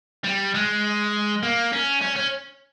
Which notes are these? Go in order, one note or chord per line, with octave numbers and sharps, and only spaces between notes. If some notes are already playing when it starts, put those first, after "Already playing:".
G3
G#3
A#3
C#4
C#4
C#4